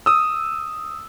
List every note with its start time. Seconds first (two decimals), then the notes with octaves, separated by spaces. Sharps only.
0.06 D#6 E6